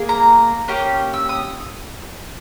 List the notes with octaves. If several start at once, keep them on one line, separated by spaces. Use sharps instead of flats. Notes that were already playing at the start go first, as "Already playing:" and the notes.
Already playing: A#3 G#4
A#5
A#3 C#4 G4
E6
D#6